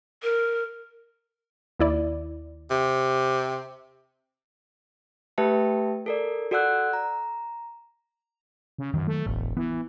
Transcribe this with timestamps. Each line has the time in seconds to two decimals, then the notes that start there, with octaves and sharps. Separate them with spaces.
0.23 A#4
1.79 D#2 E4 D5
2.71 C3
5.38 A3 G4 B4 E5 G5 A5
6.06 A4 A#4 D5
6.51 F#4 A4 D5 F#5 E6 F#6
6.93 A#5
8.78 C#3
8.94 F#2 D#3 F#3
9.07 A3
9.26 E1 A1
9.57 E3 B3